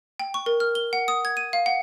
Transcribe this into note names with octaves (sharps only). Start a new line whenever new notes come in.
G5
C#6
A#4
F6
G7
F#5
D#6
G#6
D#7
F5
F#5